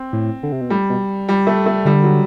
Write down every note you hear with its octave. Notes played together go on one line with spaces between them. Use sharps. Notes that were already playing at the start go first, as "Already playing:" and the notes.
Already playing: C4
A2
D3
C3
B2
A2 G3
B2
G3
A3
A3
D3 G3
F#3